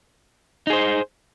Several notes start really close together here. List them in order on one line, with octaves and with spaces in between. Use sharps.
D#4 G#4 C5